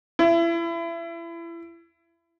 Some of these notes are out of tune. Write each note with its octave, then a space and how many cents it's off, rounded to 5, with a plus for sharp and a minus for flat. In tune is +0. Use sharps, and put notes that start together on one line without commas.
E4 +30